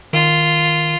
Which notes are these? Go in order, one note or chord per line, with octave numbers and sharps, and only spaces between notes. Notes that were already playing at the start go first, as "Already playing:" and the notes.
D#3 F4